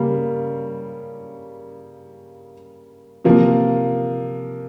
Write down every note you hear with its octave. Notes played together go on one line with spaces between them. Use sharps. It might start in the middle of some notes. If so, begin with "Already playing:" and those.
Already playing: C#3 G3 A#3
C3 F3 A#3